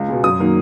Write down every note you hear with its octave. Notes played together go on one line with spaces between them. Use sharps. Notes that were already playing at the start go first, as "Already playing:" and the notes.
Already playing: C#2
B2 G#3
F#2 D#6
D#3 F#3 A#3